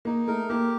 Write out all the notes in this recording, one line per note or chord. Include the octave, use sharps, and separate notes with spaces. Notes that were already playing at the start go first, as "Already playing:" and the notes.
A#3 D#4
A3 A#4
A#3 G4